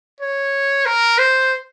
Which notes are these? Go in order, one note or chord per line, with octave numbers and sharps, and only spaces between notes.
C#5
A#4
C5